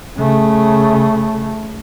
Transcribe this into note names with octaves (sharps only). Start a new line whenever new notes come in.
C#3 A3